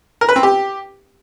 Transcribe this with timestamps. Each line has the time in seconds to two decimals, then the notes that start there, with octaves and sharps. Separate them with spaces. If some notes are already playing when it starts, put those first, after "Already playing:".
0.21 A#4
0.29 B4
0.36 C4
0.43 G4